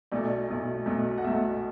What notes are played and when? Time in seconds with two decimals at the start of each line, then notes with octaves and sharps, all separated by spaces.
0.12 B1 B2 A3 D5
0.48 B1 B2 A3
0.86 B1 B2 A3
1.18 F#5
1.24 B1 B2 A3 E5